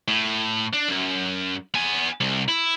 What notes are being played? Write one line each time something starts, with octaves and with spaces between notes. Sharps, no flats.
A2
D4
F#2
B3 G#5
C2
E4